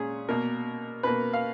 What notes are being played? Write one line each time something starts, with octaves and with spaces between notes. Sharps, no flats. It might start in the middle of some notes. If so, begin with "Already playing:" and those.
Already playing: A#2 G#3 C#4 G#4
B2 A#3 A#4
B2 A#3 B4
F5